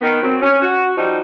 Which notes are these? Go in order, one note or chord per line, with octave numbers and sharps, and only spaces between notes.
D#3 B3
F#3 C4
C#4
F#4
F3 G3 D#4 F#4